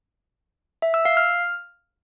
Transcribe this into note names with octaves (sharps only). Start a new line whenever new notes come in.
E5
E6
F5
F6